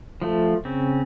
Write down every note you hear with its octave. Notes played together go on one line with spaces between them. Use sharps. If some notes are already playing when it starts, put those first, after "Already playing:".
F3 A3
C#3 C4